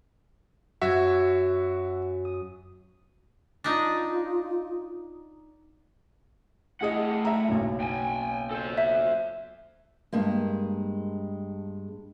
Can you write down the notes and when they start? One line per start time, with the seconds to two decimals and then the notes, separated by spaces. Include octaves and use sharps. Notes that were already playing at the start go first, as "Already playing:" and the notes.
0.81 F#2 F#4 E5 G#6
2.25 D#6
3.64 D4 D#4 F4
6.81 A2 E4 G#4 D#5 F#5
7.25 E5 A#5
7.49 F#1 B1
7.80 G5 G#5
8.51 A4 C5
8.78 E5
10.12 G2 G#3 A#3